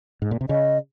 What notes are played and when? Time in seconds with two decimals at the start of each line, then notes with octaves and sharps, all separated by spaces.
0.22 G#2
0.31 A#2
0.41 C3
0.49 C#3 D#5